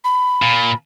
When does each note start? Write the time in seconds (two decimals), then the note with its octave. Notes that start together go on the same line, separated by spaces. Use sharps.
0.04 B5
0.42 A#2